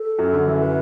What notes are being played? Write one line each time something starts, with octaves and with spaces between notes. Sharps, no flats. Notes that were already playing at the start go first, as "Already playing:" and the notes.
Already playing: A4
F#2
D3
E3
B4